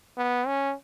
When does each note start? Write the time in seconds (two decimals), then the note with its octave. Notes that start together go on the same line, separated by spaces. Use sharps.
0.17 B3
0.47 C#4